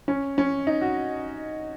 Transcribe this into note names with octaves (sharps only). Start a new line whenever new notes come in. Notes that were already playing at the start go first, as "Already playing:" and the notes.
C#4
C#4
D#4
F#4